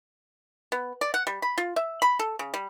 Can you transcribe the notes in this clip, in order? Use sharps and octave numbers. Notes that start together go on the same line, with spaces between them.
B3
D5
F#5
G3
B5
F4
E5
B5
A4
C#3
G3